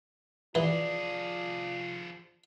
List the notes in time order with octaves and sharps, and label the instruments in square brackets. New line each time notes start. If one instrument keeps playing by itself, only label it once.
[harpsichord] E3 [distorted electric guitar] F3 G#4 [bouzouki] D4 [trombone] F4